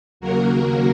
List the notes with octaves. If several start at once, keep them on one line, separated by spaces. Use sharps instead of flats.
D#2 C#3 F#3 A#3 F#4 A#4